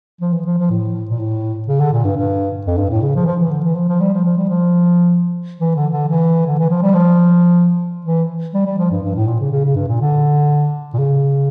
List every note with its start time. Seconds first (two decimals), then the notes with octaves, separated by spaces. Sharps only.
0.21 F3
0.33 E3
0.46 F3
0.58 F3
0.70 A2
1.11 A#2
1.19 A2
1.68 C#3
1.80 D3
1.93 A#2
2.04 G2
2.17 G2
2.67 F2
2.78 G2
2.90 A2
3.02 C#3
3.16 F3
3.23 E3
3.27 F3
3.40 E3
3.51 D3
3.65 E3
3.76 F3
3.89 F3
4.00 G3
4.14 F3
4.25 F3
4.37 G3
4.49 F3
5.60 E3
5.76 D3
5.92 D3
6.09 E3
6.47 D3
6.58 E3
6.70 F3
6.82 G3
6.94 F3
8.05 E3
8.54 G3
8.66 G3
8.78 F3
8.91 G2
9.03 G2
9.16 A2
9.28 A#2
9.40 C#3
9.52 C#3
9.65 C#3
9.76 G2
9.88 A#2
10.01 D3
10.94 A#2
10.98 C#3